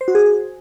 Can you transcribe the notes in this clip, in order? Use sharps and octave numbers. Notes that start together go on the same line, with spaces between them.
C5
F#4
G#4